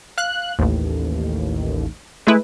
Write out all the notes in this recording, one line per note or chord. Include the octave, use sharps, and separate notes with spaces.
F5 F#6
A1 D#2
G#3 A3 E4 B4